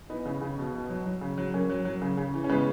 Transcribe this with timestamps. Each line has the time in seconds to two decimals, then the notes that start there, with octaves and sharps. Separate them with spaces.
0.10 E3 B3 D#4
0.25 C#3
0.41 C#3
0.58 B2
0.74 B2
0.89 F#3
1.06 F#3
1.21 C#3
1.38 F#3
1.54 F#3 A#3 C#4
1.69 F#3
1.85 F#3
2.02 C#3
2.17 C#3
2.34 E3
2.44 C#4
2.49 C#3 G#3 B3